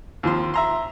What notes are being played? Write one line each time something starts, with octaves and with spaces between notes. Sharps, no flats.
D#2 F3 C6
E5 A#5 C6